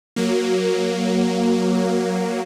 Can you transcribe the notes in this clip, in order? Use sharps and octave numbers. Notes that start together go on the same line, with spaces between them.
F#3 A#3